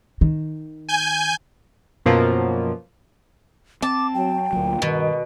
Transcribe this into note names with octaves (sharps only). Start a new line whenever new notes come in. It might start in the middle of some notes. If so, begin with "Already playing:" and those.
D#3
G#5 G6
F#2 B2 F3 F#3 A#3 F4
C4 A5 D6
F#3 G5
D2 A#2 F#3
G2 B2 D#3 F#4 A#4 D#5